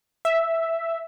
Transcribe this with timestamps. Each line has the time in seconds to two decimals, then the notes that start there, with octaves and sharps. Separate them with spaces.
0.25 E5